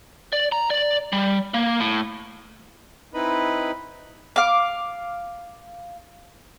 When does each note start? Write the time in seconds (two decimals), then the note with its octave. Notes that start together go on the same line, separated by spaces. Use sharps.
0.33 D5
0.52 A#5
0.70 D5
1.13 G3
1.54 A#3
1.80 A2
3.14 C4 D#4 E4 B4 D#5 B5
4.36 F5 D6